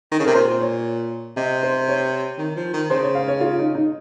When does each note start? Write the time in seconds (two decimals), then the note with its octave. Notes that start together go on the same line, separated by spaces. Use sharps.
0.12 D#3
0.19 C#3
0.26 C3 A#4
0.34 A#2 C5
0.61 C#5
1.37 C3 D#5
1.63 C5
1.88 C#5
2.38 D#3
2.56 F3
2.73 D#3
2.90 C#3 C5
3.03 C#5
3.15 F5
3.28 C#5
3.40 F4
3.58 D#4
3.75 D#4